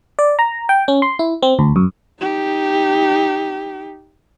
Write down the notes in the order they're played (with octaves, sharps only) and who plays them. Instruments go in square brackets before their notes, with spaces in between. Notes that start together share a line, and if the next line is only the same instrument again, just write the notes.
[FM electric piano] D5
A#5
G5
C#4
C6
E4
C4
D2
F#2
[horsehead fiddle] D#4 G4